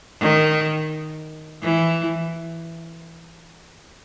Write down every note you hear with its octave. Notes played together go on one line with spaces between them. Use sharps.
D#3
E3